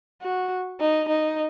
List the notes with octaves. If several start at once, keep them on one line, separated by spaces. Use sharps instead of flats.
F#4
D#4
D#4